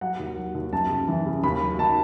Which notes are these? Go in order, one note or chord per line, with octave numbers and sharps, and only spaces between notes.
F#3 F#5
D#2
F#3
D#2
F#2 A5
C#3
E3
C#3
D#2 B5
F#3
D#3 A5